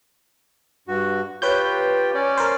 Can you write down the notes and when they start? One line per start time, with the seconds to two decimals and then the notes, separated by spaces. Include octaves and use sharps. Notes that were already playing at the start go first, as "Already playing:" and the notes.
0.88 G2 F#4
1.42 F4 G4 B4 C#5 G5 G6
2.14 C#4 D5
2.37 A#4 C5